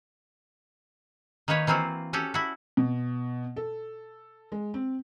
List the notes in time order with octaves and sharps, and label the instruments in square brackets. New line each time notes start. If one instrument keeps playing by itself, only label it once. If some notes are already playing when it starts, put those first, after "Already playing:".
[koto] D#3 A#3 D#4 B4 C#5
E3 A#3 C4 F4 F#4
C#4 F#4 G4 A4
E4 F#4
[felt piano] B2
A4
G#3
C4